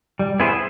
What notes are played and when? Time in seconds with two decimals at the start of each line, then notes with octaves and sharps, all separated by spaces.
0.19 G3
0.39 B3 E4 G#4 C5